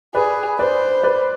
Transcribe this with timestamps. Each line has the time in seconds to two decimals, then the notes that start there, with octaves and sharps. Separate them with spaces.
0.15 G#4 B4 D5
0.59 B4 C5 D5
1.03 B4 D5